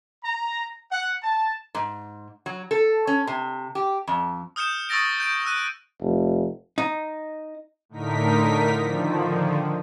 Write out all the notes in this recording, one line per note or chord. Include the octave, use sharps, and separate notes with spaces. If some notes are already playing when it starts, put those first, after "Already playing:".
A#5
F#5
A5
G#2
F#3
A4
C#4
C3
G4
F2
D#6 F6 G6 C#7 E7
C#6 D#6 E6 A6 A#6 D7
G6 D7
E6 F#6 D#7
F1
D#4
A2 D3 D#4 A#4 B6
D3 D#3 F3